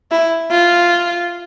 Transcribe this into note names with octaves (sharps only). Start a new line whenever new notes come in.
E4
F4